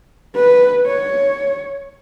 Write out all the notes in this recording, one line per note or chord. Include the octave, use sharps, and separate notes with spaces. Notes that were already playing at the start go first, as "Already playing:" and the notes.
B4
C#5